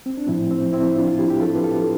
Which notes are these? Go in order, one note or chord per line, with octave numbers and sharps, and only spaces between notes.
C4
D4
A2 F3 C4 E4
C4
C4 E4
D4 F4
F4
E4 G4
G4
F4 A4
B4
F4 A4